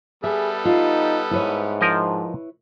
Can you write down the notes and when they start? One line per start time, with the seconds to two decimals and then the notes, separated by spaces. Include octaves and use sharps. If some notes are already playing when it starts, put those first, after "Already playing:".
0.24 G3 B3 G#4 A4 E5
0.65 D#4 F4
1.31 G#2 E4 B4 C#5
1.81 F3 A#4 D#5